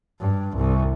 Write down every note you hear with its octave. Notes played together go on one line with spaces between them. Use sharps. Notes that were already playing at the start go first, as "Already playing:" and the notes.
G2
C2